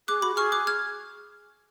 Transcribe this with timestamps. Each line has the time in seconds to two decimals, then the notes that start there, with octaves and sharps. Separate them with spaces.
0.08 G#4 D6 F#6
0.22 F#4 B5 D6
0.35 G#4 C#6 F6
0.52 D6 F#6
0.67 F6 G#6